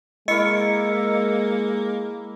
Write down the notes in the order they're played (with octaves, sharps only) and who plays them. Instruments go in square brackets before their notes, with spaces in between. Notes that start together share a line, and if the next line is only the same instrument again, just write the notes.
[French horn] G#3 [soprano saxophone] A#3 [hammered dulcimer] E4 A#4 [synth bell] D#5 C#7